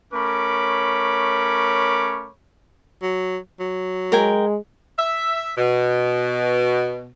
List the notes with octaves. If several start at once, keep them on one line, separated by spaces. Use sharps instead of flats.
A3 C#4 A#4 C#5 B5 D6
F#3
F#3
G#3 A#4 G5 G#5
E5
B2